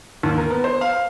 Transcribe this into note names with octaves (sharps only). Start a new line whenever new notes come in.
D#2
A#4
B3
C5
F5